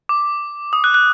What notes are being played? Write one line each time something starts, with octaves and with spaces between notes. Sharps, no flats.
D6
D#6
F#6
F#6